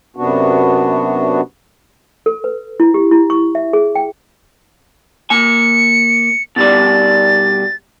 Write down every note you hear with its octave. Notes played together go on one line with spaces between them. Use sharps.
F#2 C3 B3 D4 F#4
A4
B4
E4
G4
E4
C#6
E5
G#4
G5
A#3 G#5 C#7
B2 G3 D5 A6